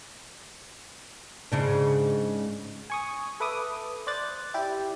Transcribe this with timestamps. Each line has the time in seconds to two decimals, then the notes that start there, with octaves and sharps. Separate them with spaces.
1.52 G#2 C#3 D4
2.90 G#5 C#6 D#6
3.40 A4 B4 E5 D6 D#6
4.07 C5 D5 F#6 A6
4.54 E4 G4 D5